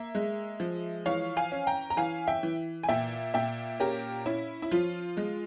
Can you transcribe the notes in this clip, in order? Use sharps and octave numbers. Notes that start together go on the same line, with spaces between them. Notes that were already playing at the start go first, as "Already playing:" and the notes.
Already playing: A#3 E5
G#3
F3
E3 C#5 F5
F5 G#5
C#4
G5 A#5
A#5
E3 F5 G#5
E5 G5
E3
G#5
A#2 E5 G5
A#2 E5 G5
C#4 G4 A#4
C#4 E4
E4
F3 F4
G#3